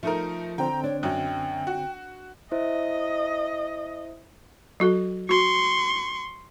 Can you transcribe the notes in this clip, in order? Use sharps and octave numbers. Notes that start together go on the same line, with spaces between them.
F3 A3 D#4 A#4
D3 C4 G5 A#5
D4 C#5
F#2 F#3 G5
F#4
E4 C5 D#5 E5
F#3 F#4 A4
F#4 C6 C#6